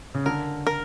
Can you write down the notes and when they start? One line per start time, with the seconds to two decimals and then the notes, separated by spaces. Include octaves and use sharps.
0.14 C#3
0.26 D3 A#4
0.67 A#4